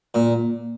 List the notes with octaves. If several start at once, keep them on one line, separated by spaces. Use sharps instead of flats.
A#2